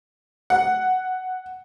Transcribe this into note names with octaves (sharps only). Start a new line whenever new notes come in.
F#5